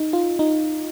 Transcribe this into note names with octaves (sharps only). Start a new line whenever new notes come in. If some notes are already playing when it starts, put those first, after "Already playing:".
Already playing: D#4
F4
D#4